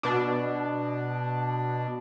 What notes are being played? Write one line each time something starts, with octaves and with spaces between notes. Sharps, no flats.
B2 D4